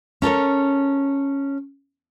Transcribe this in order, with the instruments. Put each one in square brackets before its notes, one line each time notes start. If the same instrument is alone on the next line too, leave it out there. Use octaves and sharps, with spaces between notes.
[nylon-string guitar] C#4 A4 A#4 C#5